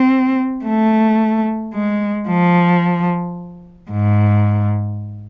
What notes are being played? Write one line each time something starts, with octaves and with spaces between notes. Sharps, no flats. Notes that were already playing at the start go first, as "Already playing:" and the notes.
Already playing: C4
A3
G#3
F3
G#2